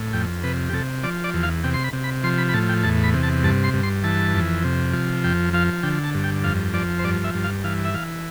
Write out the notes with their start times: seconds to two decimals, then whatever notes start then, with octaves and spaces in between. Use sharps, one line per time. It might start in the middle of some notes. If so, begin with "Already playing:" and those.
Already playing: A2
0.13 F2 G5
0.43 C3 B4
0.69 G4
0.73 C3 A4
1.04 F3 D5
1.24 D5
1.34 E2
1.43 F5
1.64 C3 G5
1.74 C6
1.84 B5
1.93 C3
2.04 B5
2.23 F3 C6
2.38 B5
2.49 B5
2.54 A2 A5
2.69 G5
2.83 E2 A5
3.04 B5
3.14 C3
3.23 A5
3.43 G2 A5
3.64 C6
3.73 G2
3.83 C6
4.04 E3 A5
4.34 F2
4.64 C3
4.93 F3
5.24 F2 G5
5.53 F3 F5
5.83 D3 G5
6.04 A5
6.14 G2
6.24 G5
6.44 F2 F5
6.74 F3 D5
6.99 C5
7.04 G2 D5
7.24 E5
7.34 G2
7.44 F5
7.64 E3 F5
7.85 E5
7.94 E3 F5